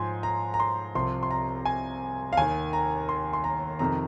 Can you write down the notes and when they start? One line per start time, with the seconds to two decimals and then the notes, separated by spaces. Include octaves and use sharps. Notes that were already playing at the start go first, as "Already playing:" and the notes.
Already playing: G#2 F3 G#5 C6
0.23 A#5
0.54 A#5
0.60 C6
0.95 C2 C3 F3 C6
1.23 C6
1.31 A#5
1.65 G#5
2.33 F5
2.37 D#2 D#3 G#5
2.73 A#5
3.09 C6
3.33 C6
3.44 A#5
3.79 F2 C3 D#3 A#5